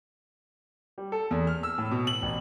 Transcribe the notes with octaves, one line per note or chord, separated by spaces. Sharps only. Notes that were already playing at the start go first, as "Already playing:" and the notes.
G3
A4
E2
F6
E6
A2
B2
F#7
A1